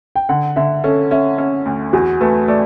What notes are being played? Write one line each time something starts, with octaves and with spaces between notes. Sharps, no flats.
G5
D3 F#5
D3 E5
C#4 A4
C#4 E5
C#4
D2
E2 F#4
A3 B4
A3 D5